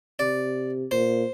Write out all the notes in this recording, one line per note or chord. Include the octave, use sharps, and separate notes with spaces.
C3 D5
A#2 C5